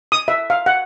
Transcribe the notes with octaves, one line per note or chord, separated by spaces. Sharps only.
D#6
E5
F5
F#5